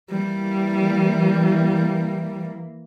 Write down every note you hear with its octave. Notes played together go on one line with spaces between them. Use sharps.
E3 G3 A#3